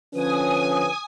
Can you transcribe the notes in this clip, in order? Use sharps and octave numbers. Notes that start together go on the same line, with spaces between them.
D3 F3 C#4 B4 G#5 D#6